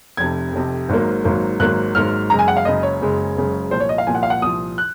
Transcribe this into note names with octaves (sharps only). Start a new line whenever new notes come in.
F1 F2 C3 G#6
F1 F2 C3
G#1 G#2 F#3 A#3
G#1 G#2 F#3 A#3
G#1 G#2 F#3 A#3 F#6
G#1 G#2 F#3 A#3 F6
F#1 F#2 C#3 G#3 A#5
G#5
F#5
F5
F#1 F#2 C#3 G#3 D#5
C#5
F#1 F#2 C#3 G#3
F#1 F#2 C#3 G#3
C2 A#2 F3 C5
C#5
D#5
F5
C2 A#2 F3 G#5
F#5
F5
F#5
C2 A#2 F3 D#6
F#6